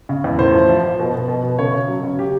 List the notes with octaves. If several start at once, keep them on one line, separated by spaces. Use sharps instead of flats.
C#3
E2
A2 C5
F3
F3
F3
B2
B2
B2
B2
C#3 C#5
C#3
F#3
C#3
G4